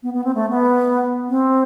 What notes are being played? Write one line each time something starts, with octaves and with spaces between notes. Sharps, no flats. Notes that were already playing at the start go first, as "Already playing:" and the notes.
B3
B3
C4
A3
B3
C4